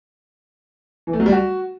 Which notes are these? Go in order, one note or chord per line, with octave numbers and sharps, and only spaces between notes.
E3
A3
F#3
G3
F#4